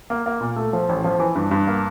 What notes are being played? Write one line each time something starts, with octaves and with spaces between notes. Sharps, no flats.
A#3
A#3
A#2
A3
F3
A1
F3
E3
G2
G2
A#3